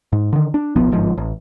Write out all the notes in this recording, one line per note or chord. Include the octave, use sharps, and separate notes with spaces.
G#2
D3 D#3
D4
D#1 B1 F3 B3
G1 G#2 F3
A1